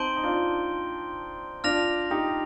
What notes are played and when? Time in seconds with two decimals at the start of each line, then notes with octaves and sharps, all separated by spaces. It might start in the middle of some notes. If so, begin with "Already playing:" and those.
Already playing: C4 D#4 A5 C6 G6 D7 G7
0.16 D#4
0.23 D4 F4
1.64 D4 F4 F6 A#6 F7
2.11 D#4 G4